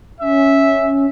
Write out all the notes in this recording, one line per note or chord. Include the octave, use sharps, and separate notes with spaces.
C#4 E5